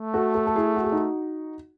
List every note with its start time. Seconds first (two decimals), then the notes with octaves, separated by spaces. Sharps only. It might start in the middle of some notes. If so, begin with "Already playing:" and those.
Already playing: A3
0.14 F#4 A4
0.35 F#4 A4
0.47 A4
0.55 E4 G#4
0.76 F#4
0.84 G#4
0.92 D#4 F#4